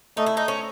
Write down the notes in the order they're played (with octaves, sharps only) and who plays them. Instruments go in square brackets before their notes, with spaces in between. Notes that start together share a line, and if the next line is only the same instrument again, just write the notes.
[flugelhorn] A3 [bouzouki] D#4
[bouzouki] E4
D#4
C#4